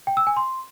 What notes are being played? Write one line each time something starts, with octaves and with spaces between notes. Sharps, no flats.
G5
E6
G#5
C6